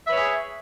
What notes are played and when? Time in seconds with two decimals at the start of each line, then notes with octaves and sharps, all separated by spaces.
0.06 E5
0.08 B4
0.11 C#5
0.14 G#4